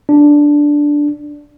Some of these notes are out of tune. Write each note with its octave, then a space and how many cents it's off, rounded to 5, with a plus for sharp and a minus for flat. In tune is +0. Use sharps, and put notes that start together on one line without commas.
D4 -5